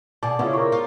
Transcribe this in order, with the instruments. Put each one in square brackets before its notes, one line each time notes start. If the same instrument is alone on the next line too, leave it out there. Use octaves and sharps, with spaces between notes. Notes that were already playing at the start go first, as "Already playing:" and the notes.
[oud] B2 G#4 [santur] D5 [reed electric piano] A5
[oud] C#3 [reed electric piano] B3 E4 F4 [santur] C#5
[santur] A#4 C5 C#5
[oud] F4